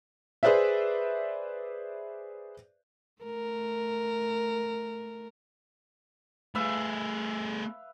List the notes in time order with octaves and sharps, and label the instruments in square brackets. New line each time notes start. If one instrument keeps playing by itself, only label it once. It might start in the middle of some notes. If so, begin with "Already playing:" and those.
[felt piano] G#4 B4 C5 D5 E5
[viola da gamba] A3 A#4
[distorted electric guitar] A3 G#4 [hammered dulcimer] B4 E5 F5